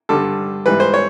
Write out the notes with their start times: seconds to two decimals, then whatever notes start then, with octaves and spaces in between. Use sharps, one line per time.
0.09 G2 D3 G3 A4
0.66 G#2 E3 G3 B4
0.80 C5
0.94 C#5